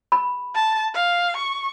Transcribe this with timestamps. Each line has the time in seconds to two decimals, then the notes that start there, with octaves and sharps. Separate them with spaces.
0.12 B5
0.55 A5
0.94 F5
1.37 C#6